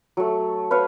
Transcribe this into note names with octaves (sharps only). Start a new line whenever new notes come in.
F#3 A3
B4 C#5 F5